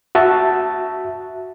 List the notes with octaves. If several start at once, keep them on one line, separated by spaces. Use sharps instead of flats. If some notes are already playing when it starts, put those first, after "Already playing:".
F#4 E5 A5